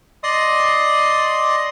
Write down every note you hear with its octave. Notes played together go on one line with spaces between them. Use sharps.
D5 D#5 C6 D#6